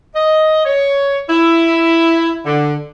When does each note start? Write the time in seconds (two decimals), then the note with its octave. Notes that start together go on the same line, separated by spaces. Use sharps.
0.15 D#5
0.65 C#5
1.30 E4
2.45 D3